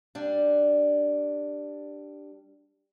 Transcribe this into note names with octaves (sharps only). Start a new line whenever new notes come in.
G3 D4